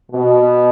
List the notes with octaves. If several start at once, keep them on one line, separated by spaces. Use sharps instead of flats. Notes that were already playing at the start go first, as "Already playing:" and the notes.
B2